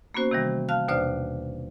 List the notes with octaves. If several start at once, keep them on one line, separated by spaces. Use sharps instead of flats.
A#3 B3 C#4 F#4 C5
C3 D#3 E3 G3
F5 A5 F6 F#6
D#2 B2 D4 C5 D5 F6